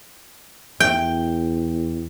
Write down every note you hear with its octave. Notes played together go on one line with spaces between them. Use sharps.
E2 G5